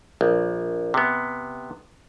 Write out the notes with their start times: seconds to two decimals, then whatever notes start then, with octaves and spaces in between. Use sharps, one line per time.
0.21 A#1
0.94 C3 B3